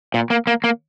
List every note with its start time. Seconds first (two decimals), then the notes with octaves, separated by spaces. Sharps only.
0.14 A#2
0.30 A#3
0.47 A#3
0.64 A#3